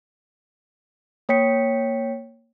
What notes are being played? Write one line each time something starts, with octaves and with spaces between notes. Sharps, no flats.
A#3 C#5 G5 B6 C#7